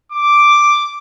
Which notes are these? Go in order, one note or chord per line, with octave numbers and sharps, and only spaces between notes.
D6